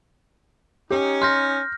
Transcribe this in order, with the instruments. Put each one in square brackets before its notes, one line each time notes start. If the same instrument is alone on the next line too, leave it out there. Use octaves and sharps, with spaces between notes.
[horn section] C#4 D#4 [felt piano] G4
[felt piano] C6 [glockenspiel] F6 G6 A#6